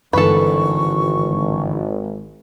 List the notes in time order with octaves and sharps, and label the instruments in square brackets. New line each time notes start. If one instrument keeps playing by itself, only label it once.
[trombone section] G#1 [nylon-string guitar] G2 D3 E3 [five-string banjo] A4 B4 [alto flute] C#6